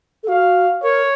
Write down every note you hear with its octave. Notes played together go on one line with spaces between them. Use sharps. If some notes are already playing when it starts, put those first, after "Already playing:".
A4
F#4 F5
A#4 C#5